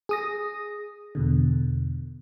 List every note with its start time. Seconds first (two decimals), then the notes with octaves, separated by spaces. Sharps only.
0.09 G#4 D#6 A#6
1.15 E2 B2 D3